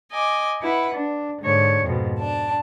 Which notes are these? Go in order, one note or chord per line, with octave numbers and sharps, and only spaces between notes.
D#5 G#5 D6
E4 B4 F#5
D4
G#2 D3 C#5
F2 G#2 B2
D4 A5